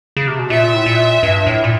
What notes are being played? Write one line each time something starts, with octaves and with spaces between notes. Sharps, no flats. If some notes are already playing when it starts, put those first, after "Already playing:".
C#3
C3
B2
A#2 E5
A2
A#2
G2
A2
A#2